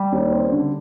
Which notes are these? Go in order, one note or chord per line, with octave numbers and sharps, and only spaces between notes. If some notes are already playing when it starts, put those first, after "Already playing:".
Already playing: G3
D#2
C4
D3